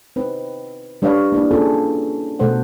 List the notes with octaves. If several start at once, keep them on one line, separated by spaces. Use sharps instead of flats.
C4 D#4 B4
G3 D4 B4 C#5 F5
A#3 D4 E4
A#3 C4 C#4 F4 G#4 A4
B2 A3 A4 C5 F#5